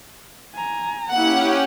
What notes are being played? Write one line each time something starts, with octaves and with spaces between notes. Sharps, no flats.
G#5 A#5
A#3 C#4 E4 G4 F#5